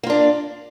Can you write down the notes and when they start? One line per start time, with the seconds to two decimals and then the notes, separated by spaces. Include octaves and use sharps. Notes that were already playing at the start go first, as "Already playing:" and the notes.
0.03 A#3
0.07 F4
0.10 D4